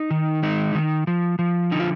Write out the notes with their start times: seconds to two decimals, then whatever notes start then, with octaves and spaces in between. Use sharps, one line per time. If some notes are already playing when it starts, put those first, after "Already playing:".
Already playing: D#4
0.11 D#3
0.43 G#3 D#4
0.75 D#3
1.07 F3
1.39 F3
1.71 D3 D#4
1.80 F4